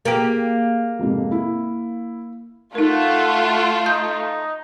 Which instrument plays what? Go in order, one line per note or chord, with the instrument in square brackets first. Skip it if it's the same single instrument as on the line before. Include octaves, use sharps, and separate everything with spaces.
[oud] A#3 G4 [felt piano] G#4 D7
[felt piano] F2 G#2 C3
E4
[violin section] A3 F4 [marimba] D#4 A#4 [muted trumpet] F#5
[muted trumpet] D#4 [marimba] G6